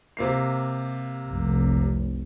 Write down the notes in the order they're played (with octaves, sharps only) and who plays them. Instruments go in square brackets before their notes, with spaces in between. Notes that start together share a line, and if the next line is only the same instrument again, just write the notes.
[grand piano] C3 A#3 C7
[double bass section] F1 C2